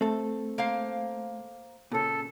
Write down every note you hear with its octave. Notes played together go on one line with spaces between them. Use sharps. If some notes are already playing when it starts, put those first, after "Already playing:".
A3 C4 A4
A#3 C5 F5
A#2 C#3 A4